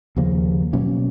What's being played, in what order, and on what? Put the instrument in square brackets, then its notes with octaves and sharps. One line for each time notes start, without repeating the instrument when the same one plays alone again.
[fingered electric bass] D#2 C#3 F3 A#3
B2 F#3 A#3 C#4